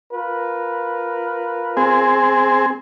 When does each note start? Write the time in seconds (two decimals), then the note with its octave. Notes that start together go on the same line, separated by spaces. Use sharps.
0.12 F4 A#4 B4
1.77 C4 G#4